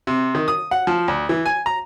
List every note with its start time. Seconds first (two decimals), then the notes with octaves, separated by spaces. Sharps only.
0.07 C3
0.35 D#3
0.48 D#6
0.71 F#5
0.87 F3
1.08 D2
1.29 E3
1.46 G#5
1.66 A#5